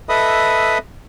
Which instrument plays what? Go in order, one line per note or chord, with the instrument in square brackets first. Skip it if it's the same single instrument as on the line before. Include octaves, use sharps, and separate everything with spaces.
[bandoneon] A4 B4 D#5 E5 B5 D#6